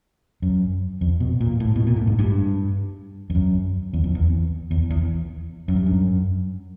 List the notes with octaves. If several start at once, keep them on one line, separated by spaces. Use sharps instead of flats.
F#2
F2
B2
A#2
A2
B2
A#2
A2
G#2
G2
F2
F#2
E2
F2
E2
E2
E2
F#2
G2
F#2